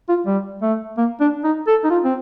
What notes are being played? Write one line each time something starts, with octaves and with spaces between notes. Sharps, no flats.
F4
G3
A3
A#3
D4
D#4
A4
D#4
F4
C4